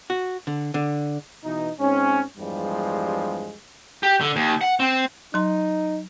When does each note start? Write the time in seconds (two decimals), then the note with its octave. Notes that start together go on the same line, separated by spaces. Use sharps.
0.10 F#4
0.47 D3
0.74 D3
1.44 B2 E3 D#4
1.79 G#2 C4 C#4
2.38 E2 G2 F3 G3 G#3
4.03 G4
4.21 D3
4.36 D#2
4.61 F#5
4.80 C4
5.34 F#3 D#4 C6